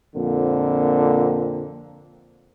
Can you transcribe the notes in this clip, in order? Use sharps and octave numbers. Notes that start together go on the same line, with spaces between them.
F2 A#2 D3 A#3 C4